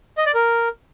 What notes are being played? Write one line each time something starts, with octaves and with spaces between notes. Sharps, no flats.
D#5
D5
A#4